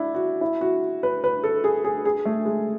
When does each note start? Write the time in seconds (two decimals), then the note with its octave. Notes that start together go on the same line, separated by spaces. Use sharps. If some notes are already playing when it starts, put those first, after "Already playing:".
Already playing: D4 E4
0.15 F#4
0.41 E4
0.61 F#4
1.03 B4
1.24 B4
1.44 A4
1.64 G#4
1.84 G#4
2.05 G#4
2.26 A3
2.45 G#3